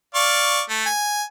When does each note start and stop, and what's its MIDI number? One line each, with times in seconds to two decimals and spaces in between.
0.15 0.61 74
0.15 0.61 77
0.15 0.61 85
0.69 0.86 57
0.86 1.23 80